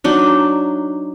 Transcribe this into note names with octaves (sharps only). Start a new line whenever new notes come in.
F#3 D4 D#4